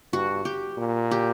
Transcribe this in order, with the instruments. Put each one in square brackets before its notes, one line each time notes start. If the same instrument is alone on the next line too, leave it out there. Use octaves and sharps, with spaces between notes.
[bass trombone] G2 [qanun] F#4
[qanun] G4
[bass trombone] A#2
[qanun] G4